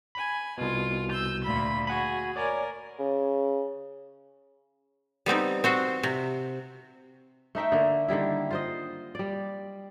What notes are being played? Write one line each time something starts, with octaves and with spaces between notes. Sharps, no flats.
G#5 B5
C2 B2 F4
E6 G6
D2 A#2 B5
F#4 G#4 F#5 B5
A#4 C#5 D5 G#5
C#3
G3 B3 C4 D#4
C4 F#4 C5
C3
A3 D#4 E5 G5
D3 A#3
D3 D#3 G3 E4
F4 C5 D#5
G3 D5